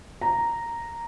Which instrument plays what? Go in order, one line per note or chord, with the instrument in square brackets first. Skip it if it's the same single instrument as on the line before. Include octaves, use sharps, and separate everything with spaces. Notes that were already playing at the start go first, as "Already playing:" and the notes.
[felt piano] A#5